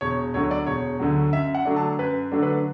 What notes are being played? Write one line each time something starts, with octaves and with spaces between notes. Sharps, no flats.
E1 C#5
D2 D3 F#3 C#5
D5
E1 C#5
D2 D3 F#3
F#2 E5
F#5
D3 F#3 A3 D4
A5
F#2 B4
D3 F#3 A3 D4
B4